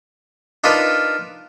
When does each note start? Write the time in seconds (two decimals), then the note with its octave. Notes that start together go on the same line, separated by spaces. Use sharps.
0.64 D4 D#4 F4 A#4 B4 D#5